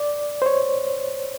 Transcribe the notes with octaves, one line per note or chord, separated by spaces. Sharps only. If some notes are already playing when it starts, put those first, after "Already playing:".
Already playing: D5
C5
C#5